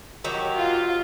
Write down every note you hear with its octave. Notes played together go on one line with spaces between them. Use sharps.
D#3 F#3 G4
F4